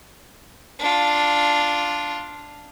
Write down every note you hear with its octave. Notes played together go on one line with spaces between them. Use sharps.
D4 F4